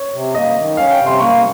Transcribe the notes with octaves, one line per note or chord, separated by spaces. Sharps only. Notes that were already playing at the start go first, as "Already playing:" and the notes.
Already playing: C#5
C3
A#3 D#5
D#3
C#4 F5
G5
C3
C6
A#3 C#6